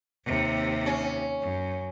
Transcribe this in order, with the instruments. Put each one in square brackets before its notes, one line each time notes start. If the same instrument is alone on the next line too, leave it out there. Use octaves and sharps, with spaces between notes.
[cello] D#2 C3
[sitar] C#4
[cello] F#2